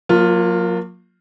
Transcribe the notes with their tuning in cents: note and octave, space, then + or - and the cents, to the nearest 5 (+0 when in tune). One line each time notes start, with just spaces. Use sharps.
F#3 -40 A#3 +0 F4 +0